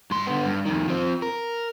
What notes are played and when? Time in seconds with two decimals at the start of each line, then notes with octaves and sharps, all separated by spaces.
0.11 G2 C6
0.27 D3 B3
0.45 G2
0.66 F2 D#3
0.88 F3 C4
1.22 A#4